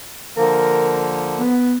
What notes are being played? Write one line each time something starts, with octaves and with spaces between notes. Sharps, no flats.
D3 F3 A#3 A#4
B3